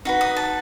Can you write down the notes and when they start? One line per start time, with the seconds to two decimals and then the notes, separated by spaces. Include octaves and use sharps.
0.05 D#4 F#4 B4
0.21 D#6
0.36 A5